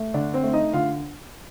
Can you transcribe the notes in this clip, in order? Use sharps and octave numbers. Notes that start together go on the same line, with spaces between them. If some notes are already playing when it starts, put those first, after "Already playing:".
Already playing: A3
D3 D4 D5
C4 C5
A3
D#4 D#5
D3 F4 F5